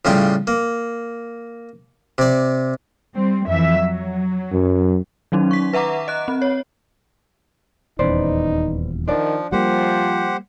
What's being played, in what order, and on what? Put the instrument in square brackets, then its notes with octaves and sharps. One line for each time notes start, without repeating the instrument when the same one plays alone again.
[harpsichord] A2 C#3 G3 F4 G4
A#3
C3 D5
[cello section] G3 C4
F2 E3 E5
F#3
[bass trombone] F#2
[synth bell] D#3 F#3 C#4 D#4
C#6 B6
B4 E5 F#5 A#5 D6
D#5 F#6
C4
C#5
[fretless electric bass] D#1 E2 C#4 [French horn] D#4 [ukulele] B4 C5 D5
[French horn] D#3 [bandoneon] F3 [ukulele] D4 D5
[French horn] F3 [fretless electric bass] G3 A#3 [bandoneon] G4 C5 F#5